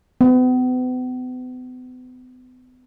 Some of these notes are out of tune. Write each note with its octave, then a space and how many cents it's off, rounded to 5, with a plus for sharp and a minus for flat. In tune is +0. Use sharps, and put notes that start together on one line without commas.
B3 +40